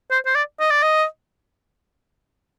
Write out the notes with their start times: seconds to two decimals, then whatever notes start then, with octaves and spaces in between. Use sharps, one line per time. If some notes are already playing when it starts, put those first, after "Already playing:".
0.11 C5
0.26 C5
0.35 D5
0.60 D#5
0.71 D5
0.83 D#5